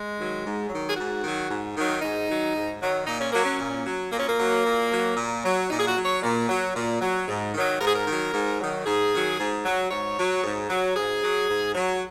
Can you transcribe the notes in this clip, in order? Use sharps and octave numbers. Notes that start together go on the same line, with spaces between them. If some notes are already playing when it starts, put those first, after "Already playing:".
Already playing: G#3
D#3 F#3
G#2
D#3 F#3
G#4
G#2 F#4
D#3 F#3
G#2
D#3 F#3
G#2 D#4
D#3 F#3
G#2
D#3 F#3
A#2 D#4
C#4
F#3 A#3
C#4
A#2
F#3
A#2 A#3
C#4
A#3
F#3
A#2
F#3
A#2
F#3
A#2 D#4
G#4
F#4
F#3
C#5
A#2
F#3
A#2
F#3
G#2
D#3 F#3
G#2 A#4
G#4
A#4
D#3 F#3
G#2
D#3 F#3
G#2 G#4
D#3 F#3
G#2
F#3
G#2 C#5
F#3
G#2
F#3
G#2 G#4
F#3
G#2
F#3